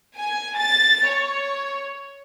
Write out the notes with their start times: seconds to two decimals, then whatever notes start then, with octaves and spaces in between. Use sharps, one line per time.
0.17 G#5
0.58 A6
1.08 C#5